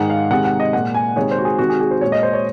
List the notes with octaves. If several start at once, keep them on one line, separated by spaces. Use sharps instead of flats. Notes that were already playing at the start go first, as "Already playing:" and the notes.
Already playing: G#2 D#3 G#3 F#5
F5
C3 D#3 G#3 F#5
F#5
D#5
A#2 G#3 F#5
G#5
C3 D#3 G#3 C#5
C5
F#4
G#4
C3 D#3 G#3 F#4
G#4
G#4
C5
A#2 G#3 C#5
D#5
C5
C#5